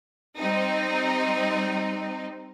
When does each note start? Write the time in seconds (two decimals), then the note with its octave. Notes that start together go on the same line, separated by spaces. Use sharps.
0.38 G3 C4 D#4